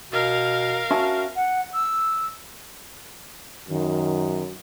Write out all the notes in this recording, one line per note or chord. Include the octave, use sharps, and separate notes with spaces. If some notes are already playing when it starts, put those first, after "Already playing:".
B2 A#4 F5
C#4 F#4 E5 A5
F#5
E6
F#2 D#3